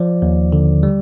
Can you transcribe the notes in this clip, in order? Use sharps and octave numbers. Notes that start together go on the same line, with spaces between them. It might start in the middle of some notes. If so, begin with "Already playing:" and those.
Already playing: F3 D5
D#2
D3
G3